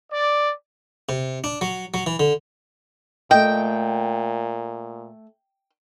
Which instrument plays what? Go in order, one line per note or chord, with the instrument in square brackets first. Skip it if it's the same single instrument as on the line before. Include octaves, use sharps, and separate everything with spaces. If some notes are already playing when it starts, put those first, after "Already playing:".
[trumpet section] D5
[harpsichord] C3
D4
F#3
F#3
E3
D3
[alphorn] A#2 [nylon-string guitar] A3 D#5 [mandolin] G5